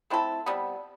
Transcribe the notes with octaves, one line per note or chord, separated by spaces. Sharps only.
A3 C4 E4 A4
C3 G3 B3